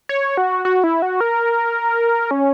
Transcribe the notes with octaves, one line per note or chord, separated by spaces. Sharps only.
C#5
F#4
F#4
E4
F#4
A#4
C#4